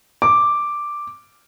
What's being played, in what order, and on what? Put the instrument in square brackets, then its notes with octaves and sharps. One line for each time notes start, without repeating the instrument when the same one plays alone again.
[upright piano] D6